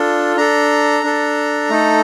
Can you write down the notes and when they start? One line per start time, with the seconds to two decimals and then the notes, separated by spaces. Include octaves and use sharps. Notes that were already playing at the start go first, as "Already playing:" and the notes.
Already playing: D4 F4 A4
0.36 D4 A4 A#5
1.04 D4 A4
1.70 A3 D#4 A4